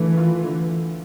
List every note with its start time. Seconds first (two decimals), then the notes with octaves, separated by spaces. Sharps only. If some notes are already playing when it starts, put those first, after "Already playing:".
Already playing: D3 E3 A3
0.17 F4
0.44 D3